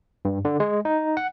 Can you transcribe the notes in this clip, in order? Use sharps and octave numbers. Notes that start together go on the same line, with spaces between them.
G2
D3
G#3
D#4
F#5